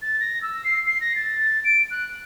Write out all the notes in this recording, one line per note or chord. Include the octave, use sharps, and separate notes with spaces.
A6
A#6
E6
C7
C7
A#6
A6
D7
F#6